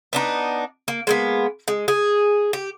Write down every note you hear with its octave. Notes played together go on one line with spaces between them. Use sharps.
B3 D4 D#4
A#3
G#3 A#3 B3
G#3
G#4
G4